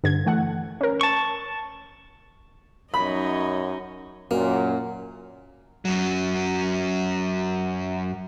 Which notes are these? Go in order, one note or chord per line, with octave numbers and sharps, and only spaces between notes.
G2 D3 G#6
E3 A3 F#5
C#4 A#4
A5 C#6
F#2 D#4 C#5 D#5 B5
F#2 A#2 A#3
F#2 F#3